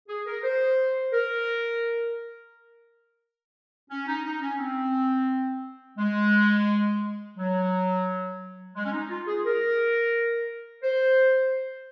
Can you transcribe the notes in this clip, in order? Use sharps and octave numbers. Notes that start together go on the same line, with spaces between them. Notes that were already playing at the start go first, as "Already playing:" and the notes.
G#4
A#4
C5
A#4
C#4
D#4
D#4
C#4
C4
G#3
F#3
G#3
C#4
D#4
F4
G#4
A#4
C5